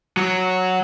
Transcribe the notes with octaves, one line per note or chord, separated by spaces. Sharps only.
F#3